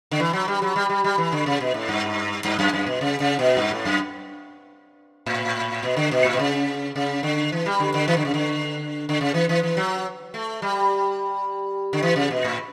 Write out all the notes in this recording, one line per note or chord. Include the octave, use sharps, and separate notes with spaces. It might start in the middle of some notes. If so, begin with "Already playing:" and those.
D3
E3
F#3
G3
F#3
G3
G3
G3
E3
D3
C#3
B2
A2
G2
G2
F#2
F#2
B2
C#3
C#3
B2
G2
A2
F#2
A2
B2
D3
B2
A2
B2
C#3
C#3
D3
E3
G3
D3
D3
E3
D3
C#3
D3
D3
C#3
E3
E3
E3
F#3
A3
G3
D3
E3
C#3
B2
A2